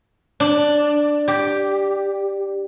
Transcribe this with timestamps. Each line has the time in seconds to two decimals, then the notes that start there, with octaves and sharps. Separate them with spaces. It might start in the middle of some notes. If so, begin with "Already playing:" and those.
0.40 D4
1.28 G4